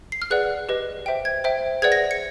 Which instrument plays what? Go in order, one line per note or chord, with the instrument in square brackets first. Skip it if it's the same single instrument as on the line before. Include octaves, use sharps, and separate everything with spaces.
[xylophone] C7
F6
G#4 B4 D5 F#5 F#6
G4 B4 D#5
C5 E5 G5
G#6
C5 E5 G5
G#4 B4 D5 F#5 G#6
A#6
C#7